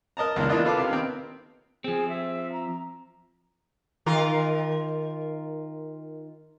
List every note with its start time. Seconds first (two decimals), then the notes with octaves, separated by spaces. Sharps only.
0.17 A#4 D#5 A5 A#5
0.36 C#2 B2 E3 A#3 D4
0.49 E3 A#3 D4 E4 F4 D#5
0.65 F4 A4 B4 F5 A5 D6
0.77 C3 F5
0.89 D#3 B3 C4
1.84 F3 C4 G#4
2.08 E5
2.52 A#5
4.06 D#3 F4 A#4